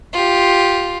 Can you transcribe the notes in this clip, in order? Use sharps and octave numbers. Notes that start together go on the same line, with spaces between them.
F4 G4